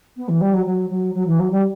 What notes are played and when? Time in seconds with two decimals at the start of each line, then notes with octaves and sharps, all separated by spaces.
0.17 B3
0.28 E3
0.41 G3
0.53 F#3
0.66 F#3
0.90 F#3
1.14 F#3
1.27 E3
1.39 F#3
1.51 G3